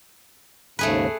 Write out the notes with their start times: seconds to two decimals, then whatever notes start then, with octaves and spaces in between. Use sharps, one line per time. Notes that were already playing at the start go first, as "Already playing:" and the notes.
0.79 D#2 G#2 C#3 A3 G#4 B4